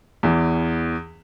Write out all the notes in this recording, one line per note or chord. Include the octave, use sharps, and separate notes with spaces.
E2 E3